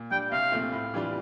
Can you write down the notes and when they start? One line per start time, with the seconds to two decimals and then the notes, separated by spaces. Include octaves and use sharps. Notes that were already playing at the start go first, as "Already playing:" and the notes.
Already playing: A#2
0.11 G3 D4 G5
0.32 C2 F5
0.52 A#2 A3 C4 F4
0.73 A2
0.94 E3 G3 D4 F4